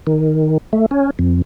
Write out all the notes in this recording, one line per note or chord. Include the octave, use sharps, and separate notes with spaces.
D#3
A3
C#4
F2